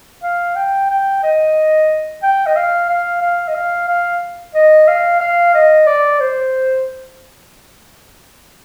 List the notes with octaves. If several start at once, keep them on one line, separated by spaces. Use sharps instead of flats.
F5
G5
G5
D#5
G5
D#5
F5
F5
F5
D#5
F5
F5
D#5
F5
F5
D#5
D5
C5